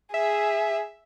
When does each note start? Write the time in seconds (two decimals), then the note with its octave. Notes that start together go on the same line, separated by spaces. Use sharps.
0.14 G#4 E5